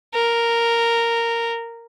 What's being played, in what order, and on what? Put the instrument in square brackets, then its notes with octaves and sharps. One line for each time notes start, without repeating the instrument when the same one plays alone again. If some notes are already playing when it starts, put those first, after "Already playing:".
[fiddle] A#4